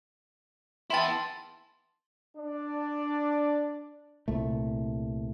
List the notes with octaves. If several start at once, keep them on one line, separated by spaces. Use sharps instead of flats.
B3 E4 E5 G5 A5 C6 A6
D4 D5
C2 A#2 A3